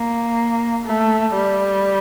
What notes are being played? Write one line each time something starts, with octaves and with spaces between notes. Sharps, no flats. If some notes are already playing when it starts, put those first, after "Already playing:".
Already playing: A#3
A3
G3